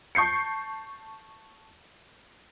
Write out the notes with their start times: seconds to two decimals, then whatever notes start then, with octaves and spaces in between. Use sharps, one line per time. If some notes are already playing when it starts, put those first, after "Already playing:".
0.15 A5 C#6 G6 C7 C#7